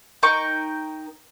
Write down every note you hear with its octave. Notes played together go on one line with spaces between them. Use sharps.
D#4 A#4 G5 C#6